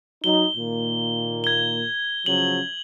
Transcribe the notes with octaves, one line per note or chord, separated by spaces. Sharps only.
F#3 D#4 G7
A#2 D#3 A#3
G#6 G7
C#3 F3 F#3 F#7